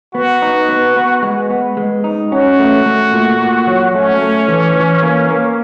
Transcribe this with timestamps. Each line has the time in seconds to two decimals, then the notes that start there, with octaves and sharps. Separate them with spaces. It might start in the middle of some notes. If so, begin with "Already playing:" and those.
0.14 B3 F#4
0.42 D#4
0.69 B3
0.96 B3
1.22 G#3
1.50 B3
1.77 G#3
2.04 D#4
2.32 C#4 F#4
2.59 A3
2.86 A3
3.12 A#2
3.41 A#2
3.67 F#3
3.94 A3 C#4
4.22 A3
4.48 E3
4.76 E3
5.02 A#3
5.30 A#3